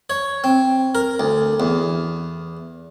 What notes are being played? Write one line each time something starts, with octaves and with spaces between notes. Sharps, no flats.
C#5
C4
A#4
D2
E2